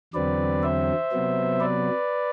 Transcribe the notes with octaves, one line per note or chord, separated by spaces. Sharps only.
E2 D3 F#3 C4 B4 D5
C5 E5
C3 F#3 B3
B4 D5